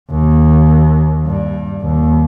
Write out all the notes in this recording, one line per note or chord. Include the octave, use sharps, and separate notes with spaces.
D#2
G2
D#2